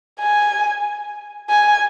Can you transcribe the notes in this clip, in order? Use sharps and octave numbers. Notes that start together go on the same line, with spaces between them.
G#5
G#5